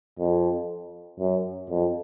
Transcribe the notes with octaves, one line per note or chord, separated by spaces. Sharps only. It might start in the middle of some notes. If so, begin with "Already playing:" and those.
F2
F#2
F2